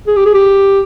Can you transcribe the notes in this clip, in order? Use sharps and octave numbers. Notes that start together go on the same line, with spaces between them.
G#4
G4
G#4
G4